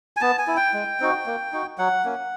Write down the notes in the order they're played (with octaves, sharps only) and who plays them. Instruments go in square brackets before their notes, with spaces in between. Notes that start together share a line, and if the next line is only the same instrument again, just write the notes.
[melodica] G#5
B3 A5
G#5
E4
G5
G#3
C4 D#4 F#4
A#3
D#4 F#4
F#3 F#5
A#3 C#4